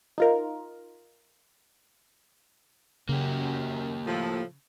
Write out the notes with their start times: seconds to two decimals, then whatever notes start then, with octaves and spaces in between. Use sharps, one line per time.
0.18 D#4 F4 A#4
3.09 F#2 C#3 A#3 G4
4.07 A2 F3